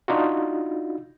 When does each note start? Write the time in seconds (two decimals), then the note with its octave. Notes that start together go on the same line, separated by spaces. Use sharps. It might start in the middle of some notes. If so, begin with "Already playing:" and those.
0.08 D4 D#4 F4 F#4